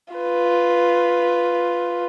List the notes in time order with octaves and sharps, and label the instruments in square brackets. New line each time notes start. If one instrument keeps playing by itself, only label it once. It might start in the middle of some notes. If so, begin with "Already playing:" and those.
[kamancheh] F4 B4